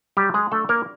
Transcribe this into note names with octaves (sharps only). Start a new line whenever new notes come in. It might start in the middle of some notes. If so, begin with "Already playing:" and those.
F#3 G3 G4
G#3 G#4
A3 D4 A4
A#3 A#4